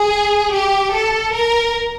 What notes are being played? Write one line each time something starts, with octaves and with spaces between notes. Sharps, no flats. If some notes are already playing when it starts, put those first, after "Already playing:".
Already playing: G#4
G4
A4
A#4